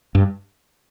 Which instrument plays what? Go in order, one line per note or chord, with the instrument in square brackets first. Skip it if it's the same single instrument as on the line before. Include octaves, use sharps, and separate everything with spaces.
[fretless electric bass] G2